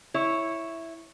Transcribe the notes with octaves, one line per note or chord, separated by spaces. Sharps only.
E4 C#5